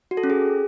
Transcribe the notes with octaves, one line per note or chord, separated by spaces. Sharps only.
F#4
A4
C#4
G#4